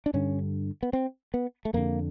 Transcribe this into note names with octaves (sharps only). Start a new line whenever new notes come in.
D4
G2 D3 C#4
B3
C4
B3
A3
F2 D3 A#3